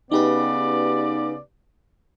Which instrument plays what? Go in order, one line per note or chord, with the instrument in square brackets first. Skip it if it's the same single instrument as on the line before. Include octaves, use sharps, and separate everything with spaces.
[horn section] C#3 B3 D5 [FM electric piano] D#4 G4 B4